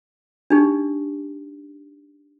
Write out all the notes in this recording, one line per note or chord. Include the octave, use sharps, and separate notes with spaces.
D4 D#4 G4